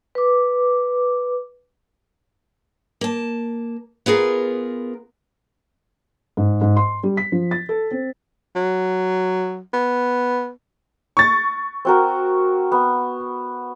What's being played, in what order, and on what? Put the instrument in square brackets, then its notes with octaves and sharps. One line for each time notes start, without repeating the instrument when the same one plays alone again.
[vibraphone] B4 D6
[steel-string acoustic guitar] A#3 A5
B3 F4 G#4 A#4
[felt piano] G#2
G#2
C6
G3
B6
F3
A6
A4
C4
[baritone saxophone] F#3
B3
[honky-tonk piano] C#6 A6
[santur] C4 F#4 A#4
B3